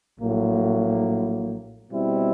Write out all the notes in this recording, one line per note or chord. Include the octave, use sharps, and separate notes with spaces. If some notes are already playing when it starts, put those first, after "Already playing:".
A#1 A2 F#3 A#3
B2 G3 C4 E4